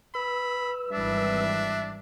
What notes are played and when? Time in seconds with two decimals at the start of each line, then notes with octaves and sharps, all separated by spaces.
0.15 B4 B5 E6
0.92 G#1 E3 G3 D4 E5